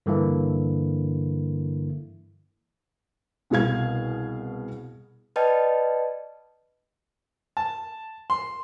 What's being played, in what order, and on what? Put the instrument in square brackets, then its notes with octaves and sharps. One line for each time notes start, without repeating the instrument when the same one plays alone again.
[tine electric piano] G2 D3 E3 A#3 E4
[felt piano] C2 B2 G#4 F5 G#6
[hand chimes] B4 D5 D#5 G5 A5
[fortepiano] A5
C6